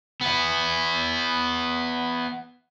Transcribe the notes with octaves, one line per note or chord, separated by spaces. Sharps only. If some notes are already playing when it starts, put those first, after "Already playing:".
B3 E4